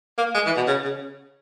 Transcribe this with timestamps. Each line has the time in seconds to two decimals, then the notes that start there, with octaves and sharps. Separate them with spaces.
0.18 A#3
0.34 G#3
0.46 E3
0.56 B2
0.67 C#3
0.84 C#3